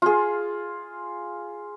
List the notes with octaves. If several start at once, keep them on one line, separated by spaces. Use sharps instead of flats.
F4 G#4